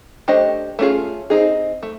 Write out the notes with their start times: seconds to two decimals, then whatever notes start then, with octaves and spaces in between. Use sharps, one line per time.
0.28 A3 D4 G4 C5 D#5
0.79 A3 C#4 F4 G#4
1.30 C4 D#4 G#4
1.83 A3